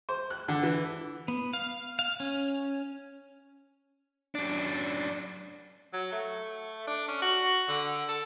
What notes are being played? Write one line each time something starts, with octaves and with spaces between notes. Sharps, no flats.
C5
F#6
D3
E3
B3
F5
F5
C#4
F#2 D4
F#3
A3
D4
C#4
F#4
D3
A4